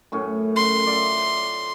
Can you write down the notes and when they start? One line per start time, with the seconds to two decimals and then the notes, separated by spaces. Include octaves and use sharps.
0.12 F#2 A2 C#4
0.56 C6
0.87 F4 D5 E5